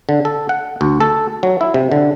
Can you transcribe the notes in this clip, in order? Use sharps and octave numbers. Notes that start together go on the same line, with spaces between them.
D3
A4
F#5
D2
A4
F#3
E4
C3
D3